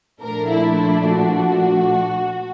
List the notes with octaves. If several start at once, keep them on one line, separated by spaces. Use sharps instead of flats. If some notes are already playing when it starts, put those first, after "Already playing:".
A#2 F3 A3 D4 A#4
E4
E4
F#4